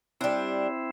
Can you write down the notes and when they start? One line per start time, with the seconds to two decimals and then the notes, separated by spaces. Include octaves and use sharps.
0.21 G3 C4 D4 E4